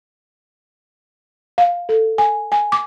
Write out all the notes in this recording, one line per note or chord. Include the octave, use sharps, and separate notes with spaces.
F5
A4
G#5
G#5
D6